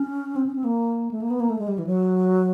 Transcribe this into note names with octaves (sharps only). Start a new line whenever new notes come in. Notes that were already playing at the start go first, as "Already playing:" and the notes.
Already playing: C#4
C4
C#4
C4
A#3
A3
A#3
B3
A#3
A3
G#3
G3
E3
F#3